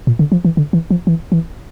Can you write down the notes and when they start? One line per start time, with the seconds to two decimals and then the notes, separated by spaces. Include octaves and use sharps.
0.07 A#2
0.19 D3
0.32 F3
0.45 E3
0.57 D3
0.73 E3
0.91 F3
1.07 E3
1.32 E3